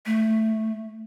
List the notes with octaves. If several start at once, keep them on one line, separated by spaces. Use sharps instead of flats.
A3